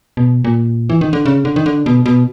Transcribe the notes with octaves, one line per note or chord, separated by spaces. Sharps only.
B2
A#2
E3
D#3
D3
C#3
D3
D#3
D3
B2
B2